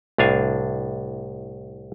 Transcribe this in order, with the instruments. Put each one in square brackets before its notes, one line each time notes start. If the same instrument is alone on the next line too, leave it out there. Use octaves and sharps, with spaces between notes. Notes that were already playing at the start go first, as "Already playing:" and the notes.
[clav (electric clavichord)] C2 A2 D4 F5 G#5